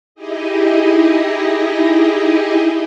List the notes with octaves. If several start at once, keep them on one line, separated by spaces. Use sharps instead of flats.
D#4 E4 G4 G#4 D#5